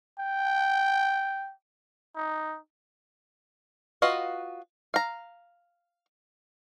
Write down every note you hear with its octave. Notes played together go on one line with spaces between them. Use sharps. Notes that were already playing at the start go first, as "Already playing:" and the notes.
G5
D#4
F4 F#4 B4 D#5 F5
F5 A#5